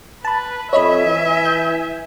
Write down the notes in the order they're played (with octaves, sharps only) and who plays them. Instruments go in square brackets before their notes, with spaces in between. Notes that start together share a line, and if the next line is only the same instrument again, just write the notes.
[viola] B4 [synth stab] A5 B5
[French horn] F2 [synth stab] C#5 D#5 B5 [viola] E5 G#5
[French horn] E3
[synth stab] G6